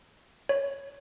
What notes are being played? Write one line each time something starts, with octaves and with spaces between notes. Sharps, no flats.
C#5